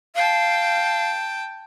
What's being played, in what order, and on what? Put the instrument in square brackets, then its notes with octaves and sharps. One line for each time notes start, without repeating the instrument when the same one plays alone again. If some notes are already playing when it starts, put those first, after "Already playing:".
[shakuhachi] F5 [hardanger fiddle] G5 A5